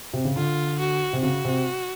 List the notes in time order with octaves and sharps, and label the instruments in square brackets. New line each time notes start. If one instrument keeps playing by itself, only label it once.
[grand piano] C3
C#3
[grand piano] D3 [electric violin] F4
[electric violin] F#4
[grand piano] C3
[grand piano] C#3 [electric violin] F#4
[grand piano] C3